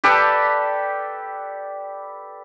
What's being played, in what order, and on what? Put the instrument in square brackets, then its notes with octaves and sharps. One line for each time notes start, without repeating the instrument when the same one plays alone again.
[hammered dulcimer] G4 A4 B4 D5